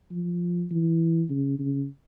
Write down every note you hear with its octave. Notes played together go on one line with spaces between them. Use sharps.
F3
E3
C#3
C#3